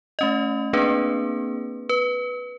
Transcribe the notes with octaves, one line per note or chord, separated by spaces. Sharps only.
A3 C#4 D#5
A#3 C4 D4 G#4 B4
B4